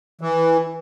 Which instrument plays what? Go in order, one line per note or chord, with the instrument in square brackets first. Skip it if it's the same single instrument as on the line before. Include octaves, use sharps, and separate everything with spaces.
[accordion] E3